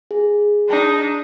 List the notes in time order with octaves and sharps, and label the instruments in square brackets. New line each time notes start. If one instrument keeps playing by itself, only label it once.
[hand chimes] G#4
[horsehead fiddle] D4 D#4